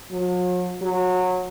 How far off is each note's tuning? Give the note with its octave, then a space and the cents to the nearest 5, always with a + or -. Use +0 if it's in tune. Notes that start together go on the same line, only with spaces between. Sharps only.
F#3 -45
F#3 -20